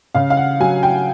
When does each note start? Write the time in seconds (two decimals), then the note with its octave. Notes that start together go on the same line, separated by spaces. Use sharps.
0.15 C#3 F5
0.30 F5
0.37 F#5
0.60 F#3 G#5
0.83 G5